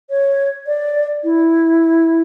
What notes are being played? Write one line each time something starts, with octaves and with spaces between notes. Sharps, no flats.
C#5
D5
E4